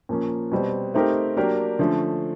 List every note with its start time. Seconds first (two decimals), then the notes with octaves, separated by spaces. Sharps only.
0.09 A#2 F3 A#3 C#4
0.52 B2 G3 C4
0.94 A3 C4 D#4 G4 A#4
1.37 F#3 A#3 D4 G4 A#4
1.79 D3 F3 A3 C#4